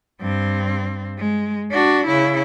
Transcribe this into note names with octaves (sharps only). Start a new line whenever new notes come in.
G2 C4
G#3
D4 F#4
C#3 E4